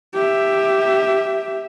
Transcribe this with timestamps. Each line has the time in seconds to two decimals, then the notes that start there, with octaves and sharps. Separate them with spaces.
0.14 G4 E5